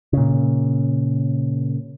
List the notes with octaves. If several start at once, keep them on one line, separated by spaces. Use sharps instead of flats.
A#2 C#3